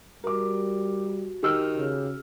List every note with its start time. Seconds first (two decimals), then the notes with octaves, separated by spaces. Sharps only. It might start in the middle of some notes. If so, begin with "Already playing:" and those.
0.24 G3 F#4 A#4 D6
1.43 D#3 G4 E6 F6
1.78 C#3